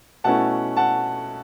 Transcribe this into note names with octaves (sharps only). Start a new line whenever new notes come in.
B2 A3 C#4 E4 F#5 A5
F#5 A5